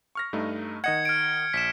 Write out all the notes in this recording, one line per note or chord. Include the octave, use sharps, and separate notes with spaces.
C#6 F6 A#6
G2 A3 D#4
D#3 D#5 F#5 G#6 C#7
F6 G#6 D7
A#1 B6 E7